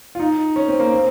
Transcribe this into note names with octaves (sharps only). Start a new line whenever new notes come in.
F4
D#4
C#4
C4
A#3
C4